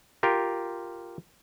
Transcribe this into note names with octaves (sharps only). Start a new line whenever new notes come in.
F4 G4 A#4